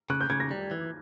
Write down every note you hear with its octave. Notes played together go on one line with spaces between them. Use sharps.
C#3 F#6
G6
C#3 G#6
A#6
G3
E3